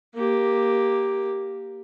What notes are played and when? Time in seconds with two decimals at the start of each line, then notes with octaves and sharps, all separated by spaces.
0.15 A#3 G4